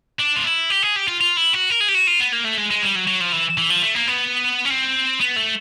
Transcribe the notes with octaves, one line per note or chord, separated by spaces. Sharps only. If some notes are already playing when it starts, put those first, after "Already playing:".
D4
F4
E4
G4
G#4
G4
F4
F4
E4
F#4
A#4
G#4
G4
F#4
F4
B3
A#3
A3
G#3
G#3
G3
F#3
F#3
F3
E3
E3
F3
A3
A#3
B3
C#4
C4
B3
A3